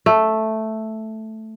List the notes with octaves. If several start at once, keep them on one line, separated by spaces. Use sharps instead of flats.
A3